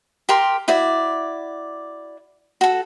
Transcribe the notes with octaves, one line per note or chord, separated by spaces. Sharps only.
G4 A#4 C6
E4 F#4 D5
F#4 A4